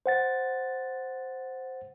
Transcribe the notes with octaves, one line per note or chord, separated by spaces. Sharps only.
C5 F#5 A6